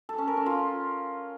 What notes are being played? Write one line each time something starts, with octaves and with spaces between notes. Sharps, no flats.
A4
C#4
A#4
C#4
F4